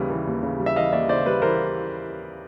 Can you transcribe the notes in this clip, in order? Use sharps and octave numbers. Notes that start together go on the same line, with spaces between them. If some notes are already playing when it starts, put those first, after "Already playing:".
Already playing: D#2 C#3 E3 G3
E3
D#2
C#3
G3
E5
E3 D#5 F5
D#2 D5 E5
C#3 C5 D5
G3 B4
E3 A#4 C5